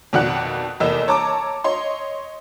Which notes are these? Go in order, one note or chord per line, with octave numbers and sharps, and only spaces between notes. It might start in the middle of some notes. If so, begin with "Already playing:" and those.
F2 B2 D#3 D5 F#5 F#6
F1 E2 A#3 D#5 E6
C#5 A5 A#5 D6
C#5 D#5 C6